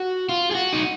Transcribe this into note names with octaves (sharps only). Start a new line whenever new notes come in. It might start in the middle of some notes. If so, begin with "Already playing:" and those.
Already playing: F#4
F4
G#4
F#4
D#4